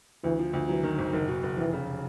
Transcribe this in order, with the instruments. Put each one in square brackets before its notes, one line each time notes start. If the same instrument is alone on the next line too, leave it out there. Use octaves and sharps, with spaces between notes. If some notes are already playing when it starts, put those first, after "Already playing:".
[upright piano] D2 [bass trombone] E3
[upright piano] F3
D2
[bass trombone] E3 [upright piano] F#3
[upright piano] D#3
G#1
[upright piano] F#1 [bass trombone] D#3
[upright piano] B2
F#1
[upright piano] F1 [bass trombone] E3
[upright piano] C#3